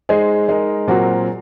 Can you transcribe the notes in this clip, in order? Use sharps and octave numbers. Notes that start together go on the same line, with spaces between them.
G#3 D#4 G#4 C5
G#3 D#4 A#4
A#2 F#3 C4 F#4 A#4